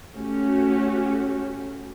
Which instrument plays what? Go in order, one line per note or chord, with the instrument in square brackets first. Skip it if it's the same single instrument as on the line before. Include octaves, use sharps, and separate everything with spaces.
[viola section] A3 C#4 F#4 G4